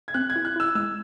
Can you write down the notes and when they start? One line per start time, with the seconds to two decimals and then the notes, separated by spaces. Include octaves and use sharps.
0.08 G#6
0.14 C4 F#6
0.30 G#6
0.36 E4
0.45 F#6
0.56 E4 E6
0.75 G#3 E6